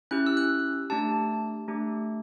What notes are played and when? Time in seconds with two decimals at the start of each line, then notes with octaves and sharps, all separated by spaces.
0.11 C#4 E4 G4 F#6
0.26 E6
0.37 F#6
0.90 A3 D4 G4 A5
1.68 A3 D4 G4